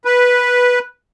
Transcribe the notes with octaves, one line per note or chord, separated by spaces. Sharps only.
B4